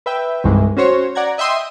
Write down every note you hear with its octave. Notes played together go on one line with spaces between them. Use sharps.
B4 E5 G5
C2 G2 D#3 E3 G#3
C#4 F#4 C5 C#5
D5 F#5 A#5 G#6
D#5 E5 G5 C6 D#6